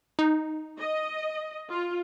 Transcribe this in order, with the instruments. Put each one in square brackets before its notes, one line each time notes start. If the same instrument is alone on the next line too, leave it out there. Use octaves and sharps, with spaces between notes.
[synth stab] D#4
[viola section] D#5
F4